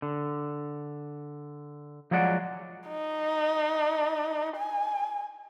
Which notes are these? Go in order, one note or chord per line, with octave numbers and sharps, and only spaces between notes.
D3
F3 F#3 G#3 D5 F#5
D#4
G#5